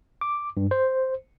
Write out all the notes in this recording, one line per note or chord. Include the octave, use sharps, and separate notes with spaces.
D6
G2
C5